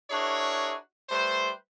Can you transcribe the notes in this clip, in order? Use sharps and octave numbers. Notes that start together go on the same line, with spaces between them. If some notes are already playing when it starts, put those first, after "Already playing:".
D4 E4 F#4 G#4 A#4 C#5
G3 A3 B4 C5